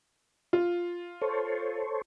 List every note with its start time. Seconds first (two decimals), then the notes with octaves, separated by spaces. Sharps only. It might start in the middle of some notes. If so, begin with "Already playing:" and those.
0.53 F4
1.22 A4 C5 C#5